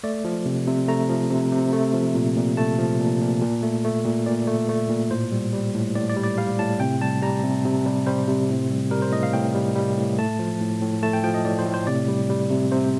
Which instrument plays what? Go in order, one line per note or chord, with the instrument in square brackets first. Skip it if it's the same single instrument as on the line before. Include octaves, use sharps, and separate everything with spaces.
[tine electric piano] A3 D5
F3
C3
C3
A3 A#5
F3
C3
C3
A3
F3
A#2
A#2
A3 A5
F3
A#2
A#2
A#2
A3
A3
A#2
A#2 D5
A3
A3
A#2
A2 C5
G3
G3
A2
A2 D5
D5
G3
D5
G3 F5
A2 A5
C3 G5
G3 A5
G3 A#5
C3
C3
G3
G3 C5
C3
A2
G3
G3 A#4
C5
A2 D#5
F5
A2 G5
G3
G3
A2
A3 A5
F3
A2
A2
A3 A5
G5
F3 G5
D#5
A2 D5
C5
A2
C5
C3 D5
G3
G3
C3
C3 C5